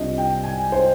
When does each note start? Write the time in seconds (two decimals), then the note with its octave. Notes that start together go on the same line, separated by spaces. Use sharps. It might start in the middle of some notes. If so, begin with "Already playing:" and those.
Already playing: C2 C3 G3 D4 F4 D#5
0.18 G5
0.43 G#5
0.72 C5